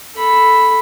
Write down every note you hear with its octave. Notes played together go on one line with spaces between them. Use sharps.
A4 B5